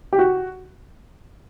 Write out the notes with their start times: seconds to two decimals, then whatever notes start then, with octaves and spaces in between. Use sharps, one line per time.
0.13 G4
0.19 F#4